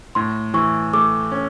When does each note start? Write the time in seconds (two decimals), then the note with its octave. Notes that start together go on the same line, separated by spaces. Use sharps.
0.15 A2 C6
0.54 E3 C#6
0.93 A3 D6
1.31 C#4